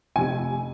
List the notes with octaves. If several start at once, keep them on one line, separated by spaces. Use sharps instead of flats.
F1 F2 C3 G#5